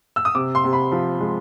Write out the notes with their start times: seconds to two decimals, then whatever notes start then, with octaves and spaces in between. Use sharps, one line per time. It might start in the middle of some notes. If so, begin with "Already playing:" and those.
0.16 E6
0.25 D#6
0.35 C3 D6
0.55 C6
0.64 C3
0.73 B5
0.92 F3
1.20 G#3